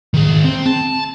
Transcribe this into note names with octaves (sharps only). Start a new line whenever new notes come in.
D#3 G#4
C4
A5